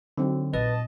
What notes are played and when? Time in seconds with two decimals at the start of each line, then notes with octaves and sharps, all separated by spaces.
0.18 D3 F#3 C4 D#4
0.54 A#1 B4 D#5 A5